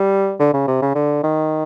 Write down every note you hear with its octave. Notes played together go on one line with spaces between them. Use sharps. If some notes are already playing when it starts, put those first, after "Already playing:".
Already playing: G3
D3
C#3
C3
C#3
D3
D#3